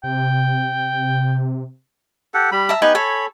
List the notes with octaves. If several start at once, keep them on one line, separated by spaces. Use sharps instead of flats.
C3 G5
G4 A4 F#5
G3 B5
E5 A5 A#5
B3 D#4 G4 B4 G#5
A4 C#5 G#5 B5